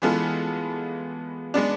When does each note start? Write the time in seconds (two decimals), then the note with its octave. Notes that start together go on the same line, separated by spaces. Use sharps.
0.02 E3 G#3 B3 F4 A4
1.54 G#3 B3 D4